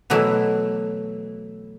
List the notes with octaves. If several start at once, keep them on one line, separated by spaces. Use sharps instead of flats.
B2 E3 F#3 A3 E4